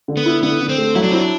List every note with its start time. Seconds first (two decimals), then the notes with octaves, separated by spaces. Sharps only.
0.08 D3
0.17 B3
0.26 E4
0.43 D3 B3
0.61 D3
0.69 C4
0.78 A3
0.95 F#3 E4
1.03 D4
1.11 C4 E4
1.19 D4